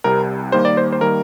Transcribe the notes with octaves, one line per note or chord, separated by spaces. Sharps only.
C2 C3 G3 A#4
D#2 D#3 G3 A#3 C5
D5
C5
C5
D#3 G3 A#3 A#4